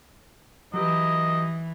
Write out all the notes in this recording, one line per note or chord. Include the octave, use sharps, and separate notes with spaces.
E3 F#3 G4 B4 D#5